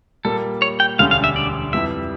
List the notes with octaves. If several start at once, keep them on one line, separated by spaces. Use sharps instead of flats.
A#2 G3 A#3 A4
C#5
G5
E1 D2 D3 G3 C#4 F5
F5
E5
D5
F2 E3 G3 E5